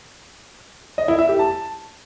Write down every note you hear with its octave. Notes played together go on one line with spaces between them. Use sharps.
D#5
E4
E5
G4
A5